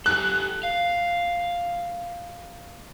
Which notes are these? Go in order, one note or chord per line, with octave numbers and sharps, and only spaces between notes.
G4 A4 F#6
F5